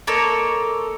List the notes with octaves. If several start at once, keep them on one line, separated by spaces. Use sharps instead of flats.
A#3 A4 C#5 D#5